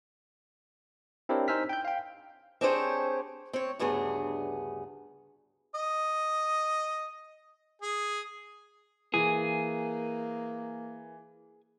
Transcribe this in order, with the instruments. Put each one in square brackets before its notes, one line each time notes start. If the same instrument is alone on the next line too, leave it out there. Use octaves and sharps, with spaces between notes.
[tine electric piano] C4 D4 E4 G4 A#4 C#5
D#4 C5 G#5 E6 F6 B6
G5 G6
F5 G5
[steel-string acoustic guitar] C4 D4 G4 G#4 C5 C#5
C4 C#5
D2 G2 C#3 B3 G#4
[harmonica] D#5
G#4
[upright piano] E3 [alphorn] A#3 [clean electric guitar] G#4